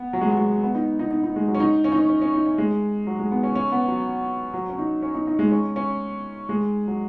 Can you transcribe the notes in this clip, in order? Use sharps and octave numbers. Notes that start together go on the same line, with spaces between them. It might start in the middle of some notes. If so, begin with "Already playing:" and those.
Already playing: B3
F#3
G#3
F#3
G#3
B3
D#4
D#4
D#4
D#4
G#3
F#3
C#4
D#4
C#4
D#4
C#4
C#4
C#4
D#4
C#4
G#3
F#3
G#3
B3
C#4
C#4
B3
F#3
F#3
C#4
D#4
C#4
D#4
D#4
G#3
C#4
C#4
G#3
F#3